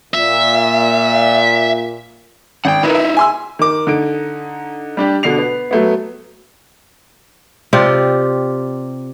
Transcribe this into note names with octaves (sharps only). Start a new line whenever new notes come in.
A#2 E5
G#1 F#5 G5
D#4 E4 A#4 B4
E5
G#5 C6 E6
D#3 D6
D3 D#4 D7
G3 D4 G4
B2 D3 D4 C7 F7
B3
F#3 A3 B3
C3 F4 G4 D5